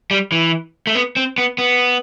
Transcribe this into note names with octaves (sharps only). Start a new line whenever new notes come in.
G3
E3
A3
B3
C4
B3
B3